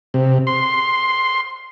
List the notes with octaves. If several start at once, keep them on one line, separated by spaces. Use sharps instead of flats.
C3
C6